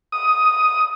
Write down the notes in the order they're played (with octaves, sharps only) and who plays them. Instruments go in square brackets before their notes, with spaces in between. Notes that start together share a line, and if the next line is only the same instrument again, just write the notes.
[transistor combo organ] D#6